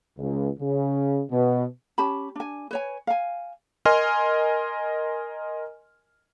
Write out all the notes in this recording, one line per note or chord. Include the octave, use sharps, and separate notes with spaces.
C#2
C#3
B2
C#4 G4 A5 B5
D4 G#5
B4 C#5 G#5
F5 G#5
A#4 D#5 G#5 C6 F6